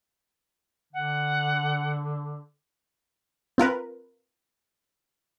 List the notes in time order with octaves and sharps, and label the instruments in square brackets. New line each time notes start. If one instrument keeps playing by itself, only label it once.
[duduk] D3 [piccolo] F#5
[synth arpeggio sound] C4 F4 A#4 B4